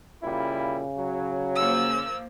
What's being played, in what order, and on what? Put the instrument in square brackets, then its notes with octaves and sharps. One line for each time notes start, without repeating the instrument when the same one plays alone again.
[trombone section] A#2 G3 E4 [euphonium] C#3
[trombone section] F#3
[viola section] F3 A#3 [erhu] E6